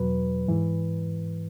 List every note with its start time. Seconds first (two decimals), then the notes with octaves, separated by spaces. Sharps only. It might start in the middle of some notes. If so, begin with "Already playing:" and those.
Already playing: E2 B2 F#3 B4
0.48 G#2 E3